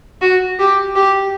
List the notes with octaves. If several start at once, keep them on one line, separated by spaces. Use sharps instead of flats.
F#4
G4
G4